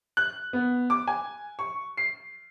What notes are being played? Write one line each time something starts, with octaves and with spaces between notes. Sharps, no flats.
F#6
B3
D6
G#5
C#6
C7